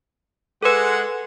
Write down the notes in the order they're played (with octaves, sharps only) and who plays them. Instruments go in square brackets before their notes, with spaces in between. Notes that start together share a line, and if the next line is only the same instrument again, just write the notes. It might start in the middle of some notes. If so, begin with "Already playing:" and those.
[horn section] G#3 F#5 [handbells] A4 B4